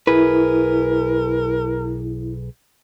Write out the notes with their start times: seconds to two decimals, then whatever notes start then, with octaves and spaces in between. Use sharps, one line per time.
0.07 B1 E4 G#4 A#4 B4